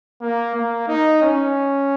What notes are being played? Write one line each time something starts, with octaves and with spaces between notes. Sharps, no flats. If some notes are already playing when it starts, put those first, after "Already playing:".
A#3
A#3
D#4
C#4